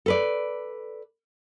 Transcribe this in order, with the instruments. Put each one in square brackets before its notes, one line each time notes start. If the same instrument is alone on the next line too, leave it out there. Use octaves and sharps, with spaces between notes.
[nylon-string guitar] A4 B4 D5